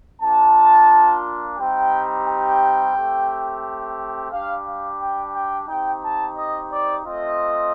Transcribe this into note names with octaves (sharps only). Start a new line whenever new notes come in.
A#3 D4 F4 A5
G3 C4 D#4 G4 G5
G5
A3 C4 G4
G3 D4 G4 F5
F5
G5
G5
C4 D#4 G4 G5
A5
D#5
D5
A3 C4 F4 D#5